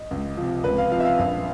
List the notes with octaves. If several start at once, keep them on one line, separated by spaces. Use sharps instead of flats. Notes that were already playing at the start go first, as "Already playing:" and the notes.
Already playing: D#5
C#2
C3 F3
C#2 B4
F5
C3 F3 F5
E5
F5
A#1